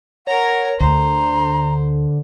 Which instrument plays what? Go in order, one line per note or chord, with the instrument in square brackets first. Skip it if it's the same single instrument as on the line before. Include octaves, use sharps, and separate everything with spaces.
[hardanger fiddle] A#4 A#5 [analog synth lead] C#5 [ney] F#5
[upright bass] D2 [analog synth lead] D3 [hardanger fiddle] C5 [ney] A#5